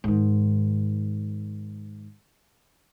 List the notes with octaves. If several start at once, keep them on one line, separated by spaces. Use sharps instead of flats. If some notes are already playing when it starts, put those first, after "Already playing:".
G#2 D#3